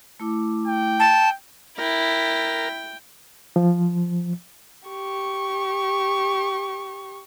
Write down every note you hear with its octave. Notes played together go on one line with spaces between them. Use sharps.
A3 E4 D6
G5
A5
E4 A#4 G5
F3
G4 C#6